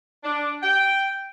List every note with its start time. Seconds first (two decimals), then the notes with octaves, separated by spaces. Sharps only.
0.24 D4
0.63 G5